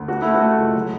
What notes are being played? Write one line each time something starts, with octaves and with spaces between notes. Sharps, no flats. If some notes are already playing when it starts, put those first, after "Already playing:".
Already playing: D2
A3 F#4
A3 E4
F#4
A3
C#2
F#3